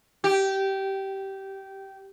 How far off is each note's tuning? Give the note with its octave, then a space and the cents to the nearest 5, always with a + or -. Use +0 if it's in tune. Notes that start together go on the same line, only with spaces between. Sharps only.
G4 -15